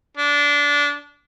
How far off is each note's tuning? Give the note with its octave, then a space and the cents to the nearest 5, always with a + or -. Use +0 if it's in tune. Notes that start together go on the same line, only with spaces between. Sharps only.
D4 -20